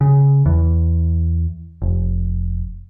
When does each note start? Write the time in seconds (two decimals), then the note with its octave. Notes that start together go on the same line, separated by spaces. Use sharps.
0.01 C#3
0.46 E2
1.82 F1